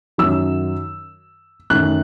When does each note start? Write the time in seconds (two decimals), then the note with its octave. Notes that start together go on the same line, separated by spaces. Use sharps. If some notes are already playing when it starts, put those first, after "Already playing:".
0.18 F#2 D#3 F#3 E6
1.70 F#2 D#3 A3 F#6